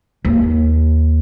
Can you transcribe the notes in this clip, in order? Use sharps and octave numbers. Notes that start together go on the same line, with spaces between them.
D#2